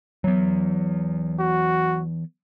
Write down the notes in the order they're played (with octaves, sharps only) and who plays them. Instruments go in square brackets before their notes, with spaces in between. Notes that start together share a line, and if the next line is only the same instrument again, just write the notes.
[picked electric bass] E3 B3 [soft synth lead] F#3
[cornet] F#4